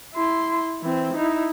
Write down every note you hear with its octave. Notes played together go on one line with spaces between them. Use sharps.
E4 C6
E3 C4
D#4 E4